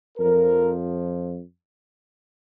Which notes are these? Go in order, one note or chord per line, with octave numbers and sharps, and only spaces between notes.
F2 F3 A#4